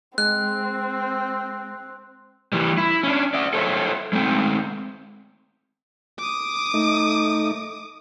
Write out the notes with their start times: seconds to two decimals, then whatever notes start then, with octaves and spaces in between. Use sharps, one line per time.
0.18 G#3 C4 F#6
2.52 E3 G3
2.77 E4
3.03 C#4 D4
3.34 D5 E5
3.53 A4 C5 C#5 E5
4.13 G#3 A3 C4
6.18 D6 D#6
6.74 A3 D#4